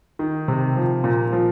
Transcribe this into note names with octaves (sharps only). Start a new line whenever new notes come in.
D#3
C3
F3
A#2
F3